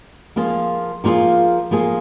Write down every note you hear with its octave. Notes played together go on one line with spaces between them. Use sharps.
F3 A#3 F4 G#4
F3 A#3 F4 G#4
F3 A#3 F4 G#4